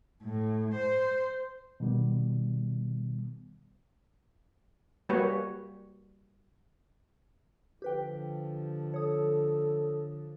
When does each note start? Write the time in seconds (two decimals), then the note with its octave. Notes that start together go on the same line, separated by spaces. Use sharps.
0.22 A2
0.73 C5
1.80 B2 D#3 G3 B3
5.09 G3 A#3 F#4 B4 C#5
7.82 D3 F3 G4 B4 G5
8.94 A4 C#5 D#6